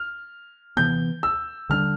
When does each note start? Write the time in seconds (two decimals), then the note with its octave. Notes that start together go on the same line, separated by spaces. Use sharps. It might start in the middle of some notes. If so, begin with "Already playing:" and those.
Already playing: F6
0.77 C3 E3 B3 G6
1.23 E6
1.69 D3 G3 D4 F6